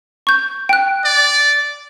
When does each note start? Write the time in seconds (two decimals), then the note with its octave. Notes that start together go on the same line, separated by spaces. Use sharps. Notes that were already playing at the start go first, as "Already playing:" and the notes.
0.27 C#6 G6
0.69 G5 F#6
1.05 D5